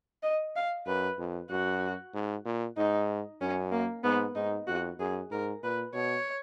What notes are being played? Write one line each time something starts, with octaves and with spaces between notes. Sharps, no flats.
D#5
F5
F#2 B4
F2
F#2 F#4
G#2
A#2
G#2 D#4
F#2 C#4
A#3
G#2 B3
G#2 D#4
F2 F#4
F#2 G#4
G#2 A#4
A#2 B4
B2 C#5